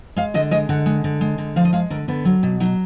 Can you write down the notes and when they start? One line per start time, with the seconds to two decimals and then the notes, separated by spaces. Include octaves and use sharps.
0.16 G#3 F5
0.34 D3 D#5
0.51 G#3 D#5
0.69 D3 F#5
0.86 G#3
1.04 D3
1.21 G#3
1.38 D3
1.56 F3 F5
1.65 D#5
1.73 G#3 F5
1.90 D3 A#4
2.08 D3 B3
2.25 F#3
2.43 B2
2.60 F#3 D#4